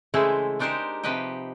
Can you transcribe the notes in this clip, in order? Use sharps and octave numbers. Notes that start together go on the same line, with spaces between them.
C#3 E3 G#3 A3 E4 C5
G#3 D4 D#4 G4 A#4 C5
C3 F3 G4 B4 D#5 G5